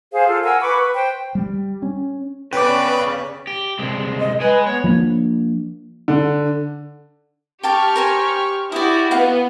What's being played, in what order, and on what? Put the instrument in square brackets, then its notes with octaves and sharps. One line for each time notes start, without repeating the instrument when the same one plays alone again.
[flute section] G#4 C5 F5
F4 A4
A#4 F#5 G#5 E6
B4 B5 C#6 D6
B4
C5 G5
[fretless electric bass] G3
C#4
[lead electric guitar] C#3 [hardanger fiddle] B3 D5 [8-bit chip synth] B4 [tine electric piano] G5 D6
[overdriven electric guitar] G4
C2 G#3
[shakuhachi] D#5
[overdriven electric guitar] G#3 G#5 [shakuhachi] B4
[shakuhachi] B3 [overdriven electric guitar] C#5
[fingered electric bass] F3 A#3 B3 D4
[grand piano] D3
[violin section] G4 C#6 F6 [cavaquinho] G5 A5 D6
[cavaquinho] A#4 C5 G#5
[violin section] E4 F#4 G4 [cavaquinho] D5 D#6
[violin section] B3 [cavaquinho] F5 F#5